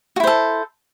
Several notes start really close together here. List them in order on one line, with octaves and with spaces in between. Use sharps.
F#4 E4 C5 A4